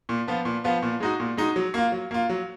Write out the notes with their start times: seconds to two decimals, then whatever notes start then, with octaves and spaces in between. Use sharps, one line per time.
0.09 A#2
0.27 F3 B3 F4
0.45 A#2
0.64 F3 B3 F4
0.82 A#2
1.00 G#3 D#4 F#4
1.20 A#2
1.37 G#3 D#4 F#4
1.56 F#3
1.74 A#3 F4
1.92 F#3
2.11 A#3 F4
2.29 F#3